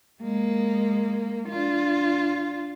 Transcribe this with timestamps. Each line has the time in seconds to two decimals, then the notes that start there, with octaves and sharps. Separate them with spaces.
0.21 G#3 A#3
1.49 D4 F4